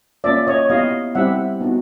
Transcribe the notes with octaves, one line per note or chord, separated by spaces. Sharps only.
A#3 C#4 F4 D5 E5
C#5 D#5
B3 E4 G4 D#5 F5
G3 C4 E4 G4 E5 F#5
B3 D#4 F#4